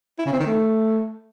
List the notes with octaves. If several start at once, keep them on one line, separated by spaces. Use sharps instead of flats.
E4
C#3
C4
D#3
A3